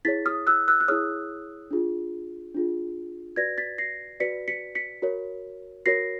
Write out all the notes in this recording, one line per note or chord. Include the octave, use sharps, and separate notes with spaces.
E4 G#4 C#5 A6 B6
D#6 F6
E6 F#6
E6 F#6
F#6
E4 G#4 C#5 D#6 F6
D4 F4 G#4
D4 F4 G#4
F#4 B4 D5 G#6 A#6
A6 B6
A#6 C7
F#4 B4 D5 B6 C#7
B6 C#7
B6 C#7
F#4 A#4 C#5
F#4 A#4 C#5 A#6 C7